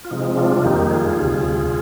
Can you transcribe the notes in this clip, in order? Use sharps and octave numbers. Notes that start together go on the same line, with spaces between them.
F4
C3 F3 G#3 C4 D#4
D4 F4
F2 D#3 G3 A#3 D#4 G4
F4 G#4
D2 C3 G3